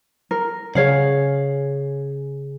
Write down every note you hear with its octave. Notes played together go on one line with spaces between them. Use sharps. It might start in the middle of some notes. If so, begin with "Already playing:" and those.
A#4
C#3 C#4 G#4 C#5 F5 F#5